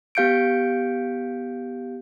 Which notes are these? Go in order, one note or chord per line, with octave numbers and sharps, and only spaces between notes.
B3 G4 F5 G6 C#7 D7